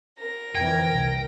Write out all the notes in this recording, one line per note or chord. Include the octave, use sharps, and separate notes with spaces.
A#4 A#6
F2 D3 E3 G5 G#6
C2